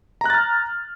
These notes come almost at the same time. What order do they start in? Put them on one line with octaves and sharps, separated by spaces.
A#5 F#6 A6 F6